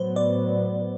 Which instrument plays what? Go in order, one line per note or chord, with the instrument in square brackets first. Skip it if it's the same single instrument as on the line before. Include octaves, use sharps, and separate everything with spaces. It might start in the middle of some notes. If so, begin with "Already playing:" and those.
Already playing: [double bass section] A2 F#3 B3 [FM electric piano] C5
[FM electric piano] D5